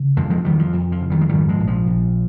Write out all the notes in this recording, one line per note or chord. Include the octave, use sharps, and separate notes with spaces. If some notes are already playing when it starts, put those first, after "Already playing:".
Already playing: C#3
F2 F3 G#3
F3 G#3
F2 D#3 G3
F3
F2
F3
C#3
D#3 G3
G#3
G#2 D#3 G3
F3 G#3
A#1
F3
A#1